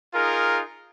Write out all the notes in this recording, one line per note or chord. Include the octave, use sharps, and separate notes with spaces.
D#4 F4 G#4 A#4